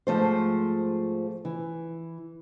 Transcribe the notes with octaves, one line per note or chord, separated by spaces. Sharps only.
G#2 F3 A3 C5
E3